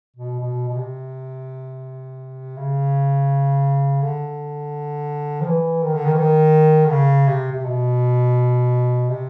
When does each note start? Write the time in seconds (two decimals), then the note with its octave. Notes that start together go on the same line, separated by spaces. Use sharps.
0.16 B2
0.40 B2
0.68 B2
0.76 C3
2.57 C#3
4.02 D3
5.41 F3
5.46 E3
5.83 D#3
5.94 D3
6.05 D#3
6.14 E3
6.18 D#3
6.86 D3
6.91 C#3
7.27 C3
7.52 C3
7.64 B2
9.09 C3